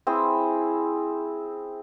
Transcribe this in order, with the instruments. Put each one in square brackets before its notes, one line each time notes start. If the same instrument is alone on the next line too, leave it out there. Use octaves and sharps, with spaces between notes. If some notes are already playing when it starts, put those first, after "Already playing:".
[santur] C4 E4 G#4